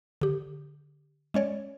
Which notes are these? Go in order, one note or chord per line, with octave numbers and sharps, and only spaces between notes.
D3 G4
G#3 C#4 C#5 D5